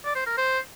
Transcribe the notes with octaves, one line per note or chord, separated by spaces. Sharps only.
D5
C5
A#4
C5